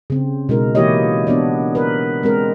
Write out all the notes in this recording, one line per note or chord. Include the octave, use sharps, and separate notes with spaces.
C#3 C4
B2 G#3 D#4 A#4
E3 A#3 E4 G4 C#5 D#5
B3 D4 C#5 D5
A#4 B4
G#3 C4 A#4